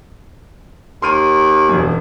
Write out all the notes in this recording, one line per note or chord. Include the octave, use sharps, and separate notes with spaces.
D#2 C6 F6 D#7
E1 F#2